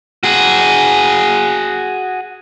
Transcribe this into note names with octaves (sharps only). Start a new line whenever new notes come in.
F#4 G#4